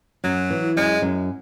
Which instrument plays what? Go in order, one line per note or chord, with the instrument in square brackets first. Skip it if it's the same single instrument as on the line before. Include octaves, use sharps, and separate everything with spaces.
[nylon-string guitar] F#2 [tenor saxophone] F#3
[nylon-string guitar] E3
[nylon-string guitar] F#2 [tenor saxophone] G#3
[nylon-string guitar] F#2